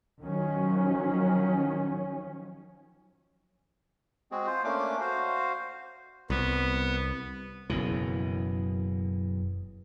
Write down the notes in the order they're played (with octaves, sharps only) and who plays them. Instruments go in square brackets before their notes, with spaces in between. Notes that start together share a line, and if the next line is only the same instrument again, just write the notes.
[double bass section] D#3 F3 F#3 C#4
[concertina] G#3 C4 F#4 G#4
F4 C5
A3 A#3 C#4 D4 D6
F#4 C5 F5
[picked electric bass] C2 [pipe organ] B3
[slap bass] F#1 F#2 B2 E3